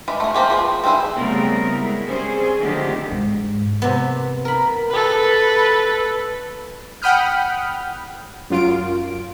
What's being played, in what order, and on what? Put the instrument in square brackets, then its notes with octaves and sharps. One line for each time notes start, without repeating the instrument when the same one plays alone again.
[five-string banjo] E3 G#3 D5 B5
A3 G#4
A#3 C4 G4 G#4
F3 G#4 B4
C4 C#4 D#4 E4 G#4
[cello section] C#3 G3 A3 B3 C4 A#4
G#3 E4
G3 C4 C#4 G#4 C5
D3 D#3 F3 A3 C4 G4
[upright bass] G#2
[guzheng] C3 B3
A#4 B5
[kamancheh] A4 B4
[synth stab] F#5 G5 B5 D#6 F6 G6
F#2 F4 D7